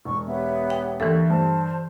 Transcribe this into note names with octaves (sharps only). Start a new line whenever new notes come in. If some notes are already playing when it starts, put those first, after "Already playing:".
E1 C#6
B3 G4 C#5 E5
G5
D#2 D3 E3 A4 E5
G2 C5 A5